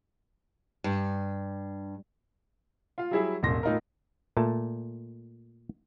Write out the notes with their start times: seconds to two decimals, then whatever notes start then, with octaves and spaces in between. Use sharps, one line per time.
0.84 G2
2.98 F4 F5
3.11 F#3 G3 E4 G#4 E5
3.43 E1 A1 C6 A#6
3.63 A2 D#4 F4 A#4
4.37 A#2 A3 A5